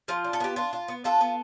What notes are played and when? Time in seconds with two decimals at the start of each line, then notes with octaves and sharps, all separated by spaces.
0.08 F3 F4
0.24 D4
0.33 A4
0.40 B3 G4
0.56 D4 F4
0.73 F4
0.88 B3
1.04 D4 F4 A4
1.21 B3